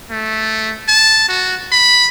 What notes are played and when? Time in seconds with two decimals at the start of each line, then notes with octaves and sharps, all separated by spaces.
0.11 A3
0.88 A5
1.29 F#4
1.72 B5